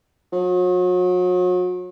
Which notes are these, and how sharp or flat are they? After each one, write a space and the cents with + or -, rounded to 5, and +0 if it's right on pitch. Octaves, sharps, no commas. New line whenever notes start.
F#3 -40